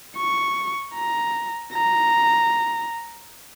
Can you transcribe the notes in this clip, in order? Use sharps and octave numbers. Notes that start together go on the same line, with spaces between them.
C#6
A#5
A#5